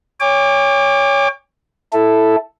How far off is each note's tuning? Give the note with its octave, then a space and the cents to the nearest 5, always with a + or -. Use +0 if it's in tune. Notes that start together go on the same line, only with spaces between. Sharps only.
C#5 +10 G#5 -45 D6 +10
E4 +0 A4 +0